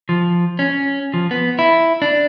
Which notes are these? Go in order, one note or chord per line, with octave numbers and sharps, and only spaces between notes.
F3
C#4
F3
B3
E4
D4